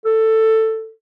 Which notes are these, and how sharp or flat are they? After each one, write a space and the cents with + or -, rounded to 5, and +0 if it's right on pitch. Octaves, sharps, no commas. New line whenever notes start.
A4 +10